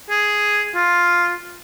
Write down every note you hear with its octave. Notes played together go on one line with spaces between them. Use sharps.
G#4
F4